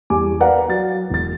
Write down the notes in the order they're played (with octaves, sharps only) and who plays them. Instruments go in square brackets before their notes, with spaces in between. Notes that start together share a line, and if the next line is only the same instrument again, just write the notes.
[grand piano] E2 E3 G3 G#5 D6
A#4 B4 D5 F5 F#5 A#5
F#3 A6
E1 A6